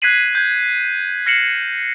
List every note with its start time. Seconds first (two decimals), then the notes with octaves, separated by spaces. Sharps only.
0.02 F#6 G#6 B6 C7 D#7 F#7
0.35 G6 G#6
1.26 F6 A#6 C7 C#7 E7 F#7